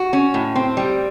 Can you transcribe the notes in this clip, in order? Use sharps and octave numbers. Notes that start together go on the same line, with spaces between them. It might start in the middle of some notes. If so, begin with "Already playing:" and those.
Already playing: F#4
C#4
A2
C4
G3